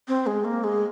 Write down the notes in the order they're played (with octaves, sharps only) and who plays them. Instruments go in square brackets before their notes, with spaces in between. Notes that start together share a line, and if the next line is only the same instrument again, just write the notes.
[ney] C4
G#3
A#3
G#3